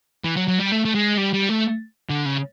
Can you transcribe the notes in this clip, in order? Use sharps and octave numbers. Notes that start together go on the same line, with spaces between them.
E3
F#3
F#3
G3
A3
A3
G#3
G3
G3
A3
D3
C#3